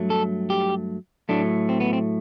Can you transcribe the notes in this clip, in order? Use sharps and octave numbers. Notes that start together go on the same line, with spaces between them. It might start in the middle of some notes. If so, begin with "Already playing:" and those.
Already playing: G2 F#3 A3
A4
G4
A2 F#3 A3 D4
C4
B3
C4